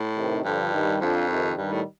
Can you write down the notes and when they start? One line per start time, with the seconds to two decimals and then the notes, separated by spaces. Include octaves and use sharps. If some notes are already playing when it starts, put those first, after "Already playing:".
Already playing: A2
0.16 C3 D#3
0.44 G2 D3 F3
0.72 D#3 G3
1.00 F2 D3 F3
1.29 C3 D#3
1.57 G2 D#3 G3
1.72 A2